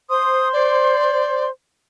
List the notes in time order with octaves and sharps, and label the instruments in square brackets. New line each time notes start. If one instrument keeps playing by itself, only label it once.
[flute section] C5 C6 [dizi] D#6
[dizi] D5